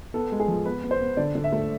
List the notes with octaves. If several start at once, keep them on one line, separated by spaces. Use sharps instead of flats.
B3 A4
G#3
G#4
F3
B3 B4
B3
C5
B3
D3 D5
D3
E5
A3